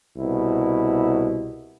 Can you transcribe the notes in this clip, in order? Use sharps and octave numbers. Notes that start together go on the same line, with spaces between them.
C2 B2 E4